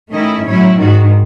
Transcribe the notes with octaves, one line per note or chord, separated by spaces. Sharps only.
D#3 A3 C#4 E4 D#5
A2 F#3 C#4 E4 C#5
G#2 D#3 G#3 F#4